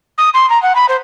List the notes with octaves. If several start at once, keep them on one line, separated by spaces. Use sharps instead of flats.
D#6
C6
A#5
F#5
B5
C5